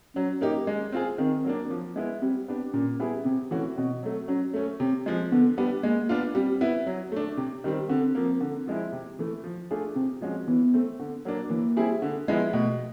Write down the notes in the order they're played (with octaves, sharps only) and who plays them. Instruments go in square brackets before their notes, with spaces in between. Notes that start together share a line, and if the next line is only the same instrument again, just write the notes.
[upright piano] F#3 [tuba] C#4
[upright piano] A#3 D#4 G4
G#3
C4 F4 G#4
[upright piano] D#3 [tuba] C4
[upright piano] F#3 A#3 D4
F3
G#3 B3 E4
[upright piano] G3 [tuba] C4
[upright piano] B3 D4 G4
[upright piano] A#2 [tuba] C#4
[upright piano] G3 B3 E4 G#4
[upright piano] C3 [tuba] C4
[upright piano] E3 A3 C#4 F#4
[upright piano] B2 [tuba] C4
[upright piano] F#3 A3
[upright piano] F#3 [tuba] C#4
[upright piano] A3 C#4
[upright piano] C3 [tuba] C4
[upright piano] F3 G#3
[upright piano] D3 [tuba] B3
[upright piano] G3 B3 D4
[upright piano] G#3 [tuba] A#3
[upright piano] B3 D4 F4
[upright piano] G3 [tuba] C4
[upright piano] B3 E4
F#3
A3 D4
[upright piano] C3 [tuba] C4
[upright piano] D#3 G3 C4
[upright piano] D3 [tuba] C4
[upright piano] F3 A#3
D3
F3 G#3 C4 E4
C3
E3 A3
F3
A3 D4 F4 G#4
[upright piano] C3 [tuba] C4
[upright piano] F3 G#3 C#4 F#4
[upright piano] E3 [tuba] B3
[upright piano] A3 C4
D3
F#3 A#3 D4
[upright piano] E3 [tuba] A#3
[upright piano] G3 C4 E4 G#4
D3
F3 G#3 B3 E4
[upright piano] B2 [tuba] A3